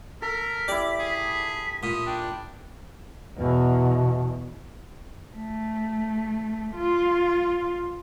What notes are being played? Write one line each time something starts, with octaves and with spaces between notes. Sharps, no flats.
A4 A#4 B6
E4 G4 D5
G#4
A#2 D#6
D4 G5
E2 B2
A3
F4